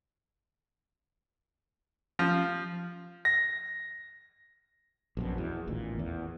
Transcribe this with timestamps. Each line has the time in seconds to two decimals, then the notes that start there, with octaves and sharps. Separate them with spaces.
2.19 F3
3.25 A#6
5.17 A#1 F#2 B2
5.38 E2
5.67 A1 D#2 A#2
5.99 E2